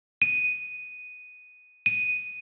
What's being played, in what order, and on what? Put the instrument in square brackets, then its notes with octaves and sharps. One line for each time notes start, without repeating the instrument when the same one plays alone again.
[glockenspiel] D#7
D#7